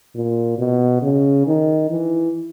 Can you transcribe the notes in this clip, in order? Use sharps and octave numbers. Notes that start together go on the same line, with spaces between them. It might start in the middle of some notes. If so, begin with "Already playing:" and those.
A#2
B2
C#3
D#3
E3